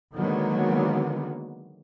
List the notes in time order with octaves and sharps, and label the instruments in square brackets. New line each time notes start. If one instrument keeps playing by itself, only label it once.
[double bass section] D3 D#3 F#3 G#3 A#3 B3